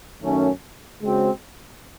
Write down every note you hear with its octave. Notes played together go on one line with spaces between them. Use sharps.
F#2 D#3 A3 C#4
C#3 G#3 C4 F#4